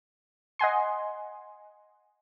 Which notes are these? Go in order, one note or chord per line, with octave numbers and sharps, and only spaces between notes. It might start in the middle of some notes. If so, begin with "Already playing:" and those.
D#5 F#5 G#5 C6